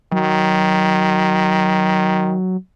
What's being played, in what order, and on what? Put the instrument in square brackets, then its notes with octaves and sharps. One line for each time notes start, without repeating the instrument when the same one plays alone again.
[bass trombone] D#3 [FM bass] F#3